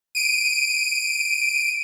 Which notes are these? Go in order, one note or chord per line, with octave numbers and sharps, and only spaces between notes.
D7 D#7